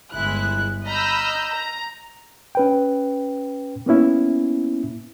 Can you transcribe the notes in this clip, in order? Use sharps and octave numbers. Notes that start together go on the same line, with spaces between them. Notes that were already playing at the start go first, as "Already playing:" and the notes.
G1 G#3 E4 F#6
D#5 A#5 B5 E6 F6 G6
A#5
C#4 B4 G5
A#3 B3 C#4 E4